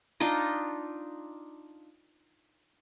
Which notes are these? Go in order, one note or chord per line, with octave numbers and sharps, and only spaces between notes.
D4 D#4 F4 D#5